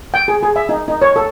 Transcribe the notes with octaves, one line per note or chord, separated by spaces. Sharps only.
G5
G#4
G#4
E5
D#4
D#4
C#5
A4